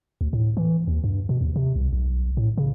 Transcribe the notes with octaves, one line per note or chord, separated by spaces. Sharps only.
D2
A2
E3
D#2
G2
B2
D#2
C3
C2
B1
A2
C#3